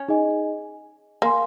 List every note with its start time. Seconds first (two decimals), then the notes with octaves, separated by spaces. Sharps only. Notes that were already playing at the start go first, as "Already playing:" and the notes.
Already playing: C#4
0.08 D#4 G#4 D#5 G#5
1.22 A#3 A#4 F5 G#5 C6